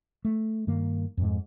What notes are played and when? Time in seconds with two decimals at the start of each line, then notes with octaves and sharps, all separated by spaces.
0.25 A3
0.67 G2 D#3 A#3
1.17 F2 G#2